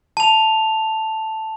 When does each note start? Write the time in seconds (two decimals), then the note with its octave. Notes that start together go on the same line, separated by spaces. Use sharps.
0.17 A5 F7